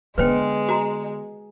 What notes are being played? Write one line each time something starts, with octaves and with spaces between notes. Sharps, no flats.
D3 G#3 B3 B4 C5 G5
F#4 A#5